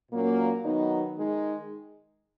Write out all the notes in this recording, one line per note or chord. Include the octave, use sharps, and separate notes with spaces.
A#2 F#3 A#3 C#4
D#3 F#3 B3 D#4
D#3 G#3 D#4